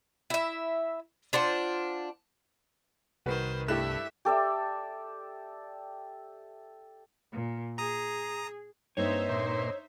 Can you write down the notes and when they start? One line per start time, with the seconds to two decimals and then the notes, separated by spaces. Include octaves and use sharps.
0.30 E4 E5
1.33 D4 F4 C5 F#5
3.26 C2 D#3 F#4 B4 C5
3.68 G2 A3 E4 G4 E5 F#6 E7
4.25 G4 A4 D5 E5
7.32 A#2
7.78 G#4 A#5 D#6
8.97 G2 A#3 C4 D#4 C5 C#5 E5
9.30 A#2 C6